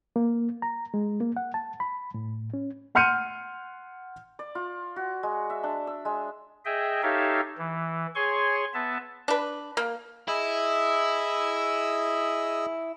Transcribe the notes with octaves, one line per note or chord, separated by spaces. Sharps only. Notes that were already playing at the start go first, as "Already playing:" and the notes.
A#3
A#5
G#3
A#3
F#5
A5
B5
A2
C#4
F#5 C6 F6 G6 C#7 D#7
D5
F4
F#4
G#3
E5
D4
E6
G#3
G#4 D#5 E5 G5
D#4 G4 A4 C#5 E5 F5
E3
G#4 C#5 G#5 C6 C#6
B3 E5 A5
D4 B4
A#3
E4 G#4 D#5 E6